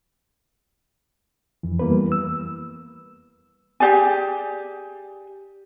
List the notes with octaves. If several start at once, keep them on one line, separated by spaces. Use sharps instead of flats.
F2 E3
E3 G3 A#3 B3 B4
E6
G4 G#4 D5 G#5